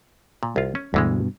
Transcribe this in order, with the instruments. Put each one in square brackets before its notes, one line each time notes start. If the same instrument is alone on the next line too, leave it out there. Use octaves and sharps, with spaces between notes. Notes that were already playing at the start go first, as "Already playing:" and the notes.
[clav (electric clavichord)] A#2
C2 F4
C#4
[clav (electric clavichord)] D2 E3 G#3 [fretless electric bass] G2 B2